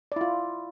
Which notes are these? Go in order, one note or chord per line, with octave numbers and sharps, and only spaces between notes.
E4 F4 D5